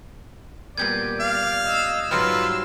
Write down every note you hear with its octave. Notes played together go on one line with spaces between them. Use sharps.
A#2 G3 B3 D5 G6 G#6
F5
D#5 E6
G#2 F#3 G3 F4 B4 C6 E6 F6